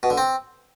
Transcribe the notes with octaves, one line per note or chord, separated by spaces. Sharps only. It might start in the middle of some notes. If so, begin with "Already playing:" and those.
B2
D3
C4